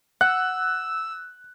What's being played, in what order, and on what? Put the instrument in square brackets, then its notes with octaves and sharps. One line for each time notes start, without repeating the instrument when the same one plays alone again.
[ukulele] F#5 [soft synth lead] E6 [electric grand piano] F#6